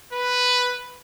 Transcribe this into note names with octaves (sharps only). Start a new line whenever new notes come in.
B4